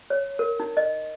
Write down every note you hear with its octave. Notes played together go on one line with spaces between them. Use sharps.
C#5
A#4
D#4
D#5